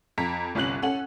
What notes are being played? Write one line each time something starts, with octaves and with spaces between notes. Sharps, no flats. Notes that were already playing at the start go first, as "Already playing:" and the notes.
F2 A#5 B6
G1 C2 C#4 F#6 F#7
C#4 A4 F#5 F#7